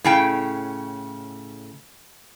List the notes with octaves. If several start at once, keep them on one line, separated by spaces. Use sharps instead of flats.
A2 C#3 G5